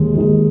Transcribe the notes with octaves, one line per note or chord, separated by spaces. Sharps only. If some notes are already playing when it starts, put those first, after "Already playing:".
Already playing: D#2 D#3 G#3
D#2 D#3 G#3